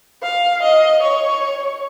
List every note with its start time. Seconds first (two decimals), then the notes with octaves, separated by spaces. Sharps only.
0.23 F5
0.62 D#5
1.03 C#5